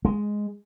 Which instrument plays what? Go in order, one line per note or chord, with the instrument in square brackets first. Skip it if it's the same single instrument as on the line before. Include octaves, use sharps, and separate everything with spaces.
[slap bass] G#3